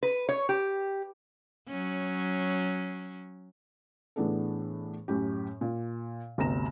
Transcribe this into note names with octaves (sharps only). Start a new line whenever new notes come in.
B4
C#5
G4
F#3 C#4
A2 E3 B3 D4 G#4 A4
F#2 A2 G4
A#2
G1 D2 C3 A#5 A#6 E7